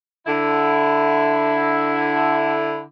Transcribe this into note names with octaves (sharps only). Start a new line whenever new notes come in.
D3 E4